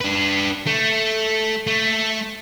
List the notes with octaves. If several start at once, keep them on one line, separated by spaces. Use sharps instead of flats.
D4 B4
A3
A3